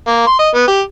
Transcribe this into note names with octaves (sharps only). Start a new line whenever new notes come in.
A#3
C6
D#5
B3
G4